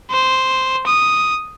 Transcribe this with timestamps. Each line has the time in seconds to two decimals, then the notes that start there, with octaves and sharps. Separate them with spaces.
0.11 C5
0.87 D#6